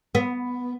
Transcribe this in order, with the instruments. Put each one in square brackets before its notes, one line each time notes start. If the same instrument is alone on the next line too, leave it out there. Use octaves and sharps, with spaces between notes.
[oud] B3